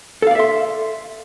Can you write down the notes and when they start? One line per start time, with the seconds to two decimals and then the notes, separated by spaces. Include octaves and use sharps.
0.22 A4
0.27 F5
0.31 D5
0.35 E5
0.39 C6